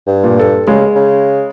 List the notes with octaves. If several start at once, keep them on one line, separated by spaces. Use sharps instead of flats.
G2
A#2
A4
C#3 G#3
C#3